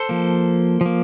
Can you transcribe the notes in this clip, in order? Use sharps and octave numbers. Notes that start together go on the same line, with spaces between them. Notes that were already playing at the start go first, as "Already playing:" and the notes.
Already playing: A4 C5
F3 A#3
F3 A#3